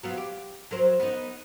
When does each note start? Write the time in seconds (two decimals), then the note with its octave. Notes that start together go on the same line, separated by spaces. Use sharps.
0.03 F#3 B3 F4
0.17 G4
0.71 F#3 A#4 C5
1.00 B3 D#4